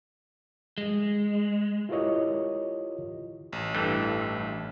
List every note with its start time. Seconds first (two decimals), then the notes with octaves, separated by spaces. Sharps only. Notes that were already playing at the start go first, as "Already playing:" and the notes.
0.78 G#3
1.89 E4 F4 G4 A#4 C#5 D#5
3.53 A1
3.75 G2 E3 A3